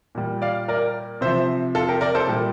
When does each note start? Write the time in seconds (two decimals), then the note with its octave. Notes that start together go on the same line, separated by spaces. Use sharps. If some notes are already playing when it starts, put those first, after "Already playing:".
0.15 A#2 G3
0.42 D5 F5
0.68 A#4 D5
1.21 C3 F3 C5 E5
1.75 F4 A4
1.88 G4 A#4
2.01 A#4 D5
2.15 A4 C5
2.27 A#2 G3